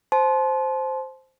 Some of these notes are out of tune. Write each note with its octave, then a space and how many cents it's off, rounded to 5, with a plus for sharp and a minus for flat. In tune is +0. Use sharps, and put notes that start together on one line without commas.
C5 +0 A5 -35 C6 +0